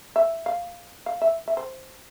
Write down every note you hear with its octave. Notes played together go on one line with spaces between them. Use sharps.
E5
F5
F5
E5
E5
C5